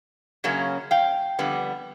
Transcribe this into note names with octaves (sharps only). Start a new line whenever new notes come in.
F#2 C#3 F#3 A#3 C#4
F5 G5
F2 D3 G3 B3